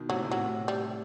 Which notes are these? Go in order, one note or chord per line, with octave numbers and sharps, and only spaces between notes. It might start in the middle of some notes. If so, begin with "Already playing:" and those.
Already playing: B2 D#3
A2 C3 F#3
A2 C3
F#3
A2 C3
G3